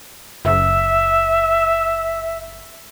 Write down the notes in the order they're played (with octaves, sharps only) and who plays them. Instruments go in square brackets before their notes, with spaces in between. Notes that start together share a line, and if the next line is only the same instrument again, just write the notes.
[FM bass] F#1 [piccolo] E5